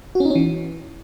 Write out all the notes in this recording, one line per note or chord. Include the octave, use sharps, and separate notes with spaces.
F#4
C#4
D#4
C#4
E3